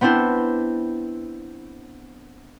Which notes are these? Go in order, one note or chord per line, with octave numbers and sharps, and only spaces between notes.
B3 C4 D4 E4 C5